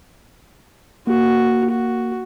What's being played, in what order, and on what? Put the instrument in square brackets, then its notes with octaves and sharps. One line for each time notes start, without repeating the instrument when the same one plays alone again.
[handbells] A#3 [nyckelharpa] F#4
[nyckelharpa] F#4